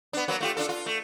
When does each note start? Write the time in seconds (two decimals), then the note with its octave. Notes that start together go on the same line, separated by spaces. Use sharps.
0.13 B3 D4
0.28 F#3 A#3 B3
0.41 A3 F4 G4
0.57 D4 F4 A4
0.69 F4
0.86 A3